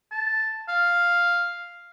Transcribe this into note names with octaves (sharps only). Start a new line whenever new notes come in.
A5
F5